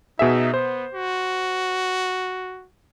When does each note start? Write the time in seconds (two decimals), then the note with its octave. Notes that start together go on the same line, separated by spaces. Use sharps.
0.19 B2 D#4 G#4 E5
0.54 B3 C5
0.94 F#4